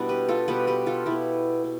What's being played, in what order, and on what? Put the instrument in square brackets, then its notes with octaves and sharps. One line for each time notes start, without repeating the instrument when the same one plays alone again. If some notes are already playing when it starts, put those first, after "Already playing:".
Already playing: [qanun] B2 G3 B3 D4 E4
G4 B4
F4 A4
B2 G3 B3 G4 B4
G4 B4
F4 A4
B2 B3 E4 G4
B2